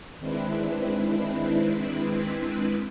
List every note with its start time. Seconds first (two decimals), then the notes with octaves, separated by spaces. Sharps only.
0.19 D#3 G#3 C4 D4 E4 B4